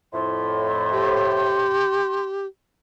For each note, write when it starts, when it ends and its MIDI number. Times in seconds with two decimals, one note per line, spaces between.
0.14 1.76 41
0.14 1.76 45
0.14 2.24 84
0.91 2.45 67